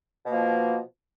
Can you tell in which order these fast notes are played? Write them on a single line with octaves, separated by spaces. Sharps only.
B2 A#3 F3